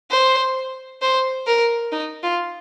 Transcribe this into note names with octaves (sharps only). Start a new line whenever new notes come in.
C5
C5
A#4
D#4
F4